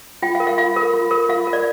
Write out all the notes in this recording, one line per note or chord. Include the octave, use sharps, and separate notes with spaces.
F4 G5
F5
A#4
F5
F4 F5
A#4
F4
A#4
F4 F5
A#4
D5